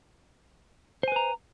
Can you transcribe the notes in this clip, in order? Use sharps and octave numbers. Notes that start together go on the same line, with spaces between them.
B4 C5 G#5 A#5